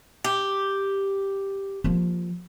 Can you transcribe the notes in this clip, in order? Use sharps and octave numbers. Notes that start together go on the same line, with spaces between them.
G4
F3 A#3